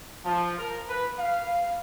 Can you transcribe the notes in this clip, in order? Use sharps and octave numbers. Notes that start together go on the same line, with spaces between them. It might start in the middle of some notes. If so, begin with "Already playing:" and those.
F3
A#4
B4
F5